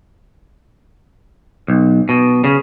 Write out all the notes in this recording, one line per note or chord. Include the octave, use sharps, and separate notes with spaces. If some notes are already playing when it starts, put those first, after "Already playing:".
B1
B2
C#3